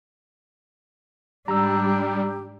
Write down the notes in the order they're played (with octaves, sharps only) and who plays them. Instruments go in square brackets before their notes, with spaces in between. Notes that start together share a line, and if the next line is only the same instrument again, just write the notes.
[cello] G#2 D4 [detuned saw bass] G3 [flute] G4 [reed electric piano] A#5 E6